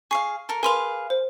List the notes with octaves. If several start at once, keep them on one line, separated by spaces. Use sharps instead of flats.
G#4 F5 C#6 C7
A4 A#4
G#4 A#4 B4 F5 C6 F7
C5